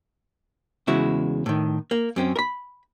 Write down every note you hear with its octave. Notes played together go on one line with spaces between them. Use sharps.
E2 C#3 G#3 E4 F#4
A2 D#3
A#3
F#2 C4 C#4
A#4 B5